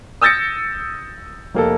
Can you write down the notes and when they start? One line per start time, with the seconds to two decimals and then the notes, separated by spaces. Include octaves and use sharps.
0.21 D#6 E6 G6 A6 A#6 C#7
1.55 F1 A#3 A4